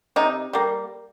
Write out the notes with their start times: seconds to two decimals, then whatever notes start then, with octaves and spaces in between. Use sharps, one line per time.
0.16 C3 D#4
0.53 G3 A#3